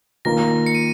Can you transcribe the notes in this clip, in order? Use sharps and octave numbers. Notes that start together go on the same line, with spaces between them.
D#3 A#3 F4 A#4 A#6
C#7
D#7